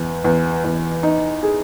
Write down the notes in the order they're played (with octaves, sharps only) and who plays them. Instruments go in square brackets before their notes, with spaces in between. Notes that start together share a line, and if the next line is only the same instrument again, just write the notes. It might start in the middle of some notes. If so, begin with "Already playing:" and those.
Already playing: [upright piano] E2
E2
E2
D#4
G#4